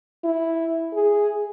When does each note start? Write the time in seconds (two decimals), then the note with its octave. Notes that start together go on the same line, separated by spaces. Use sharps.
0.24 E4
0.94 G#4